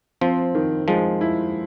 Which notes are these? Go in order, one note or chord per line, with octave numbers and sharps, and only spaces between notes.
F3 C4
D#3
F3 G#3
E4